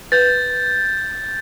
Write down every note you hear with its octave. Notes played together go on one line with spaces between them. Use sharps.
B4 G6 A6